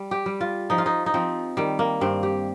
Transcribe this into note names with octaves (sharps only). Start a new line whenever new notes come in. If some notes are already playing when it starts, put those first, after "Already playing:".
Already playing: G3
G4
G3
F4
F3 D#4
F4
D#4
D#4
F3 C4
D#3 G3
A#3
G2 C4
G4